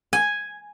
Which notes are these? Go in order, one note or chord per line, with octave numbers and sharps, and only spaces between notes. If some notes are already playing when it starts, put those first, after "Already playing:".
G#5